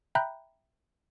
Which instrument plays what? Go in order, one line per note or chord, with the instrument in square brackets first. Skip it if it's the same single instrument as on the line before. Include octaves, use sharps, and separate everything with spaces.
[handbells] E5 G5 A#5 B5 F#6 G6